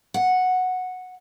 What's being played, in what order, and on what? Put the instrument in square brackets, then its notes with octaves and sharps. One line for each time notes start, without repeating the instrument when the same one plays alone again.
[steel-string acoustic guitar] F#5